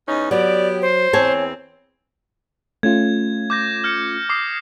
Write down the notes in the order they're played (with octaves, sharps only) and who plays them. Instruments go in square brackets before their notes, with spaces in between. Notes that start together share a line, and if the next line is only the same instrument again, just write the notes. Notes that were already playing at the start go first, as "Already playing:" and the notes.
[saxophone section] E2 C#4 D#4
[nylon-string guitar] F#3 [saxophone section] B3 G4 [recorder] D5
[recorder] C5
[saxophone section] E2 C4 [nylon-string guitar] C#5 G#5 A5
[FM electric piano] A3 C#4 F4 [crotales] G#6
[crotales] D6 G6 A#6
F6 G6 C#7
D6 D#6 C7